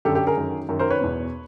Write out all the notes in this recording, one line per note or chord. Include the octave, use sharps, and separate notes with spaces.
F#2 D3 G4 A4
G4 A4
G#4 A#4
F#2 D#3
F#2 D#3
A#4 C5
B4 C#5
E2 B2